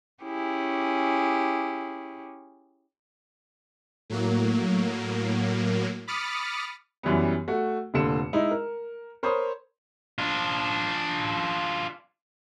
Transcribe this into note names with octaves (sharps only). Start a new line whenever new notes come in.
C#4 E4 G4 G#4
A2 F#3 A#3
B5 D6 D#6 F6 A6 C#7
F#2 E3 G3 B3
A3 F#4
F1 A#2 D3 C#7 E7
G#3 D#4 E4
A#4
A#4 C5 C#5 B5 C6 D#6
D4 F4